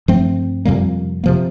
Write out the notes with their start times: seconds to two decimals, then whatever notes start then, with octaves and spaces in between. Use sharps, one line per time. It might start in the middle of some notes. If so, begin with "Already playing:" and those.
0.08 G2 F3 A3 C4
0.65 F2 C3 G3 A#3
1.24 C3 F3 A#3